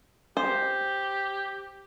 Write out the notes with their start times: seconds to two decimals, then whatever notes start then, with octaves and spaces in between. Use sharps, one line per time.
0.37 G4 C5